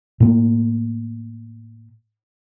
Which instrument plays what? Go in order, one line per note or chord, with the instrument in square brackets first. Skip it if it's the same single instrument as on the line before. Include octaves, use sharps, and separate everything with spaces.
[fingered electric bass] A2 A#3